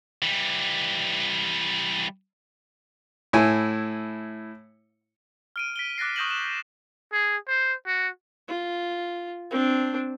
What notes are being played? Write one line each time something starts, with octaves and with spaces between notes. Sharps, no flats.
E3 G3
A2 E4 G#5
F6 D7 D#7
B6 D7 G7
D6 F#6 A6 A#6 C7
C#6 D#6 G6 A#6 E7 F#7
E7
G#4
C5
F#4
F4
C4 D4